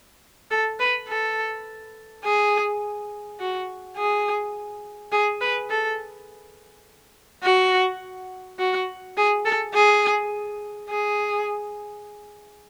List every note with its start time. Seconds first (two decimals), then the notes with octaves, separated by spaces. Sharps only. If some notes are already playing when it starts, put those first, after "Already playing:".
0.51 A4
0.80 B4
1.08 A4
2.24 G#4
3.40 F#4
3.96 G#4
5.12 G#4
5.41 B4
5.70 A4
7.43 F#4
8.59 F#4
9.17 G#4
9.45 A4
9.74 G#4
10.90 G#4